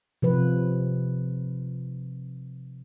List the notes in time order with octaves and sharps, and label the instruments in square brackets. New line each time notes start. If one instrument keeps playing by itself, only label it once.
[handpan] C3 F3 B4